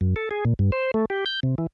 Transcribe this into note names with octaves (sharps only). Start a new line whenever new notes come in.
F#2
A4
G#4
A#2
G2
C5
A3
G4
G6
C3
E3